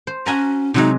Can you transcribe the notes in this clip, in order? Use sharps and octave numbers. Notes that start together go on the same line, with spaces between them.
C5
C#4 F#4 G#5 A#5
C3 F#3 G#3 D#4